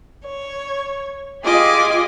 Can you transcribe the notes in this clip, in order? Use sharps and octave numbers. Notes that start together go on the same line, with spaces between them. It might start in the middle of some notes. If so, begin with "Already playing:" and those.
C#5
F4 G4 G#4 D#5 G#5 D6